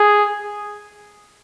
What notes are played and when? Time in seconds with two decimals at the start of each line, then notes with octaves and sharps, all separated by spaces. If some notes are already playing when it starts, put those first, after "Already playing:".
Already playing: G#4